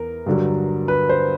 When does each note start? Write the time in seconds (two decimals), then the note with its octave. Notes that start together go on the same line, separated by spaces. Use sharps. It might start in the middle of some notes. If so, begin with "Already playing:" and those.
Already playing: E2 A#4
0.26 G2 D3 F#3
0.88 B4
1.09 C5